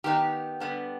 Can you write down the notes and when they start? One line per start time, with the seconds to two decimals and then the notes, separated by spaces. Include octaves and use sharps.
0.04 D#3 B3 D#4 G4
0.60 D3 G3 B3 D4